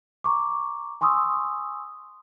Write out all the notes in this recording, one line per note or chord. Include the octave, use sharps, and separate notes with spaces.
A#5 C#6 D6
G#5 C6 C#6 D#6 E6